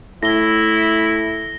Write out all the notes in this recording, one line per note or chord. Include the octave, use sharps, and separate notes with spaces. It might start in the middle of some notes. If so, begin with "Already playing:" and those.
A2 E4 A#6 G7